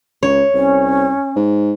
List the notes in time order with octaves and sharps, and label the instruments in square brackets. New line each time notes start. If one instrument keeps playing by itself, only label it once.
[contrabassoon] C#2 [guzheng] C#5
[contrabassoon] C2 [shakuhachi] C#4
[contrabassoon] G#2